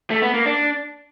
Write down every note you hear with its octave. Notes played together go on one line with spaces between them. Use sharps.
A3
B3
A#3
D4